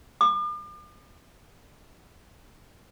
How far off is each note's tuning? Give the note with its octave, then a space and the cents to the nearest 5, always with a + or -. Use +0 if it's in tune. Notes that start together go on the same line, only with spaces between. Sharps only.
D6 +45